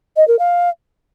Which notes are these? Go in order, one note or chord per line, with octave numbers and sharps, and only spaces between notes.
D#5
A#4
F5